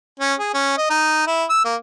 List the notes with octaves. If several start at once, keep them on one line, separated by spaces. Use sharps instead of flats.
C#4
G#4
C#4
D#5
D#4
E4
E6
A#3